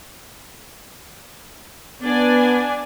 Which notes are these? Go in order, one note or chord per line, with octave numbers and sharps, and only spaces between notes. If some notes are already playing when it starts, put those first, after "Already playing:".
B3 D4 D5 G#5